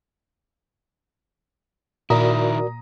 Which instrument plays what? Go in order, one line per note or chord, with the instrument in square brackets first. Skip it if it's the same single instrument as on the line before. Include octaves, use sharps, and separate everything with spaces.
[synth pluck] A#2 [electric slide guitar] D#3 E4 [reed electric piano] F#4 A#4 D5 [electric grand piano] A#5 D#6